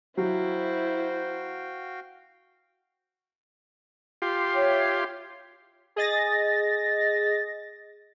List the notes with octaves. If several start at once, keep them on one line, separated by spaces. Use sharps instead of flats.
F#3 E4 F#4 C5 F5 G5
F4 G4 C6
C#5 E5 G5
G#4 D#5 A6 A#6